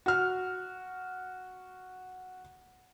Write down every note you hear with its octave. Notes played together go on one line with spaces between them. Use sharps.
F#4 F6